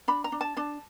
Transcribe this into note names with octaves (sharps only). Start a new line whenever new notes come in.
D4 B5
A#5
D4
A5
D4 A5